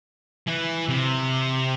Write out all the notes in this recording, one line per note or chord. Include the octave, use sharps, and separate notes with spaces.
E3
C3